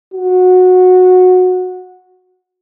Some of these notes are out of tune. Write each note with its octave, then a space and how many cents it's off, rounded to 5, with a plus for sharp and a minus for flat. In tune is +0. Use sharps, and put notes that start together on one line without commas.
F#4 -15